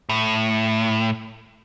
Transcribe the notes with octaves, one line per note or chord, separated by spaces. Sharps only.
A2